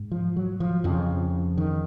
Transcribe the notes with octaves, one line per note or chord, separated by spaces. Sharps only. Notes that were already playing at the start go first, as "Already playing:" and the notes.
Already playing: G#2
F3
F#3
F3
F2 C#3 F3
D#3